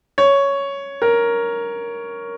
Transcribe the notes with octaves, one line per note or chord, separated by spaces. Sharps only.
C#5
A#4